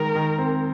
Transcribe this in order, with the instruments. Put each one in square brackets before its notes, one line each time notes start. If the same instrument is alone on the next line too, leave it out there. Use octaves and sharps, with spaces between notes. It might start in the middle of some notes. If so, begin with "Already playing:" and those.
Already playing: [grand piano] D#3 G#3 [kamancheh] A#4
[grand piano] D#3
C4